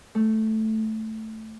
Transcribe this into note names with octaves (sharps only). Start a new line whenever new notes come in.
A3